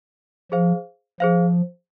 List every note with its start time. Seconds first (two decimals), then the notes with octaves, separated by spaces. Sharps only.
0.52 F3 G#4 C5 F5
1.20 F3 G#4 C5 F5